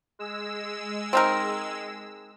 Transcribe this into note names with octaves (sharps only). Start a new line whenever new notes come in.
G#3 E6
C4 D#4 A#4